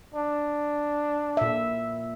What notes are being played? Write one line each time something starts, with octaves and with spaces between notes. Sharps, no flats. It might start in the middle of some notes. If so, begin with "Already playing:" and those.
D4
A#2 E5